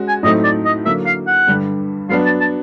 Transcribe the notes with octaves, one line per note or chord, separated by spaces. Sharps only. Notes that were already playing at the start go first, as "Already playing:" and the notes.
Already playing: G#3 C#4 F#4
G#5
A2 F#3 A3 C4 D#4 D#5
D5
D#5
D3 F#3 A#3 E5
F5
F#5
G2 D3 G3
F#3 B3 D4 F5
A5
A5